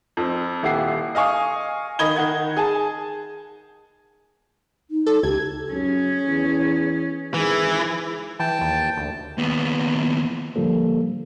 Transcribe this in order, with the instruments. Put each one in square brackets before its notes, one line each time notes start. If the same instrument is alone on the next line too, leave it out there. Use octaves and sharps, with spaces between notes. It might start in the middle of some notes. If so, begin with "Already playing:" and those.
[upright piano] F2 C4
D#1 E4 G4 F#5 C7
D#5 F5 G#5 C#6 D#6
D#3 D#5 B5 G#6 G7
D#3 F#5 G#6
G#4 G#5 A5
[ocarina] D#4
[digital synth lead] A4
[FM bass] C#2 [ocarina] G4 [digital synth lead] G#6
[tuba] F#2 [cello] C#4 G#4
[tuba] E2
[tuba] G#1 [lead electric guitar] E3 [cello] G#4
[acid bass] E3 [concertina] G5 A5
[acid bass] D#2
D2
[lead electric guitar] D#2 B3
[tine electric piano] A2 D3 F3 G3 A#3 A4